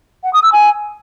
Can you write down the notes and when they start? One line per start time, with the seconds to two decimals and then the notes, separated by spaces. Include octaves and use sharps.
0.24 F#5
0.33 D#6
0.43 E6
0.52 G#5